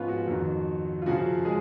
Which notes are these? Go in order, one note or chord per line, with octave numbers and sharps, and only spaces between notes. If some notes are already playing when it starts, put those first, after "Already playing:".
Already playing: G#2 F3 B3 C#4 F4 B4 C#5
F#4
F2 D#3 F#3
F4
F#2 C#3 F3 F#4
G#3 G#4